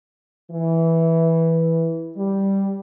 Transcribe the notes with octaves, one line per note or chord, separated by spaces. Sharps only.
E3
G3